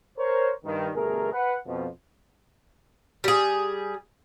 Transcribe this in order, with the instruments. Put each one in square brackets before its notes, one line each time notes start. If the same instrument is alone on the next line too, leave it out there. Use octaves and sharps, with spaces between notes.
[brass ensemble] A#4 C5 C#5
G2 D#3
G1 B2 A3 G#4 A#4
B4 F#5
F2 B2 F3
[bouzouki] G3 G#4